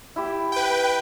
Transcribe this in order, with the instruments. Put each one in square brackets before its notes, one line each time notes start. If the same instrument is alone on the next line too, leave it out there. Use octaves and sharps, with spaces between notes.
[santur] E4 G4
[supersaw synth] B4 G5